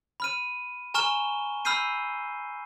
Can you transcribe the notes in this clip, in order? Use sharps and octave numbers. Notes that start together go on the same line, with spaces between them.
B5 F6 D#7
G#5 A#5 C#6 F6 E7 G7
B5 E6 F6 G6 C7 D#7